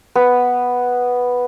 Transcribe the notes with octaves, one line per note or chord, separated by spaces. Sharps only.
B3